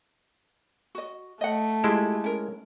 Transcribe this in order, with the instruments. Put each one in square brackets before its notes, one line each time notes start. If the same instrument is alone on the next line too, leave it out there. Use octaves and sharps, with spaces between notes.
[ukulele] F#4 D#5
[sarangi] A3 [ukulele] D#5 F#5
[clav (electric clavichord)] G#3 E4 [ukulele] F4 G4
[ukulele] C#4 A#4